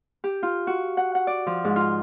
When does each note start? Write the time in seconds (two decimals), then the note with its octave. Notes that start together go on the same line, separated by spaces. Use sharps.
0.24 G4
0.43 F4
0.67 F#4
0.97 F#5
1.15 F#5
1.27 D5
1.47 F3
1.64 G#2
1.76 F4